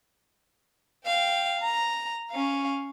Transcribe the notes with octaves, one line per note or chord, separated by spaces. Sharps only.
F5 G5
A#5
C#4 F5